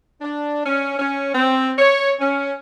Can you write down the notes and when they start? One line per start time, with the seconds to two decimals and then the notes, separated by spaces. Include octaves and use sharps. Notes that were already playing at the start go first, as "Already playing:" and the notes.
0.22 D4
0.65 C#4
0.98 C#4
1.35 C4
1.78 C#5
2.20 C#4